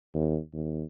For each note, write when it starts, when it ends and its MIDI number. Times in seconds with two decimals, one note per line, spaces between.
0.15 0.38 39
0.54 0.84 39